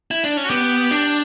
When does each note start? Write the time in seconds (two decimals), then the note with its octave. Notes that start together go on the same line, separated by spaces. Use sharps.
0.11 E4
0.24 D4
0.37 C#4
0.45 F#4
0.50 B3 G4
0.91 D4